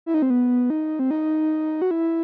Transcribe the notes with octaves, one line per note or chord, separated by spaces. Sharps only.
E4
D#4
C4
B3
D#4
C4
D#4
F#4
E4